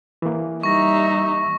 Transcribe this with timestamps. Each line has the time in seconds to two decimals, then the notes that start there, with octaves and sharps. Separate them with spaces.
0.22 E3 A#3
0.63 G3 D#4 E5 C#6 A#6